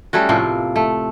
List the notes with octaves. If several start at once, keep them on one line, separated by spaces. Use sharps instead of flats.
G3 A3 C#4 F#4
A2 C3 F3 A#3
A3